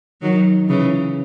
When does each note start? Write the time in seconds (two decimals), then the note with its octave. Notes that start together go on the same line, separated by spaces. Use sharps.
0.21 D#3 F#3
0.68 C#3 E3